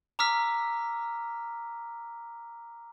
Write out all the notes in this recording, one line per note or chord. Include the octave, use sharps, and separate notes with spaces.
A#5 D6 E6 F6 B6